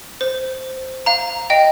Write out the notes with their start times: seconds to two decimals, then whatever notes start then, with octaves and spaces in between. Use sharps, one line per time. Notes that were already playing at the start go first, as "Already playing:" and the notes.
0.21 C5
1.06 F5 A#5
1.50 D#5 G5